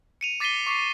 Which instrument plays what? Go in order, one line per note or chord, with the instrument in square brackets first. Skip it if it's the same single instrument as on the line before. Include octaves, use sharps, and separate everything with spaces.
[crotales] C#7 D#7 F7
D6 A6 B6 C7 D#7 G7
C#6 D6 B6 C7